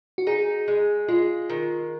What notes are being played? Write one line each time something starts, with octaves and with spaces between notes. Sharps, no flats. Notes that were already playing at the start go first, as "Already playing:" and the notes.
F#4
D#4 G#4
G#3
G#3 F4
D#3